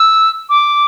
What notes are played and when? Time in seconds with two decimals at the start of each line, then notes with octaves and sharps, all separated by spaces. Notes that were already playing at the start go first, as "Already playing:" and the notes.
Already playing: E6
0.49 D6